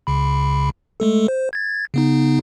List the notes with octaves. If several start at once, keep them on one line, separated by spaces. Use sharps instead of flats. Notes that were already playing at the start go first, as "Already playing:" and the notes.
C#2 C#3 B5
G#3 A3 A4
C5
G#6 A6
C#3 B3 D#4